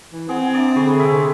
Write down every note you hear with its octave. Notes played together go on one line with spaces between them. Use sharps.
E3
C4 G#4 F#5
D4 D5 E5 A#5
D3 G#4 A4 C#5 B5
C3 G#3 E5